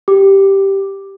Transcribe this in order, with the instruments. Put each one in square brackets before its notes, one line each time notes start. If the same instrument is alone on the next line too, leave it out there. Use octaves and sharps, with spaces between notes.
[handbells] G4